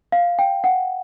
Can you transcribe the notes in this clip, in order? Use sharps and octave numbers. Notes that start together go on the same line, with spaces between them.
F5
G5
F#5